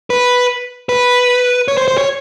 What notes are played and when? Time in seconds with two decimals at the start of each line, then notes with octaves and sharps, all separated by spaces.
0.10 B4
0.89 B4
1.68 C#5
1.77 C5
1.88 C5
1.98 C#5